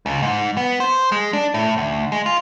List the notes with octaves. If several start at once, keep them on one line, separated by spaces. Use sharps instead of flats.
C#2
G#2
B3
C5
G#3
D4
A2
D2
G#3
F4